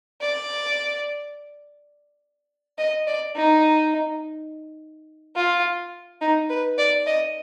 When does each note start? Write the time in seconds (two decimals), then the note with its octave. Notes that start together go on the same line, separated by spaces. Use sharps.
0.21 D5
2.79 D#5
3.07 D5
3.36 D#4
5.36 F4
6.21 D#4
6.50 B4
6.78 D5
7.07 D#5